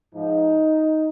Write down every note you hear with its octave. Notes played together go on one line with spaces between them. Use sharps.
G#2 F3 D#4